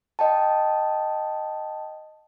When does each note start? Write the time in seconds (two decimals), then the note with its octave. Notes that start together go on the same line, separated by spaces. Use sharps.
0.19 D#5 G5 A5